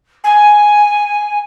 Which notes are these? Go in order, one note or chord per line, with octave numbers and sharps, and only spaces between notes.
G#5